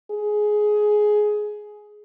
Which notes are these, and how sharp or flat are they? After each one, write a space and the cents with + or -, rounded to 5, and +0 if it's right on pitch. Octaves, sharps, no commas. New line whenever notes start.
G#4 +15